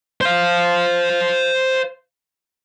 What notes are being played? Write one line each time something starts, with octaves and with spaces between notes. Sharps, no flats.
C5 F5